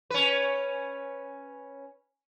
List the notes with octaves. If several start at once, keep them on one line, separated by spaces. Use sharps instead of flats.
C#4 B4